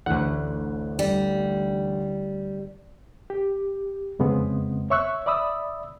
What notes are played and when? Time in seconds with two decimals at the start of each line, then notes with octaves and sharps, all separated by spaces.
0.06 A1 D2 D3 F#5 F#6
0.99 G3
3.30 G4
4.19 F2 C#3 G#3 B3 C4
4.90 C#5 E5 C#6 E6 F#6
5.26 D5 E5 B5 D#6 E6